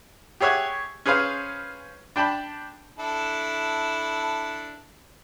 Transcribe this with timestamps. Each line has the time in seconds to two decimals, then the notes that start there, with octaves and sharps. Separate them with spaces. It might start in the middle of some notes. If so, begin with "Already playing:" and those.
0.41 G4 G#4 C#5 E5 F#5
1.06 C#4 G#4 B4 C5 F5
2.16 D4 G5 A5 B5
2.99 D4 E4 A4